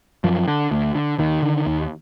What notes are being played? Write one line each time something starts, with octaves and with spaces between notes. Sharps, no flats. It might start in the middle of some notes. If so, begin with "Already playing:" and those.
F#2 F3
D3
D2
D3
D#2 D#3
D3
D#2